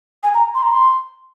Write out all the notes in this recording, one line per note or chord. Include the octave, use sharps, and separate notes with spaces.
G#5
A#5
C6
A#5
C6